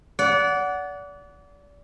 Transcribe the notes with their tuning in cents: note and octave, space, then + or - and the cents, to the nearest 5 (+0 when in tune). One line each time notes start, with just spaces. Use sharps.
D5 -30 F#5 +0